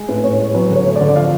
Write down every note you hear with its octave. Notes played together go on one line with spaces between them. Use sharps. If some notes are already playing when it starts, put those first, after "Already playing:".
Already playing: G#3
A2 B4
A2 C#5
G#3 C#5
F#3 B4
D3
C#5
A3
D5
D3
D5
F3 F5